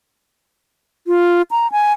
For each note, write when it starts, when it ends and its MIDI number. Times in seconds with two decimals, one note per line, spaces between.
1.07 1.42 65
1.51 1.71 82
1.72 1.93 80